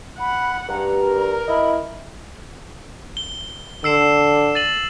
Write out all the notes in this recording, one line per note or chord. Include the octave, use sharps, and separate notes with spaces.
F#5 B5
G2 A#5
A#4
E4 D#5 B5
G7
D3 E6 C7 E7
A6 D#7 F#7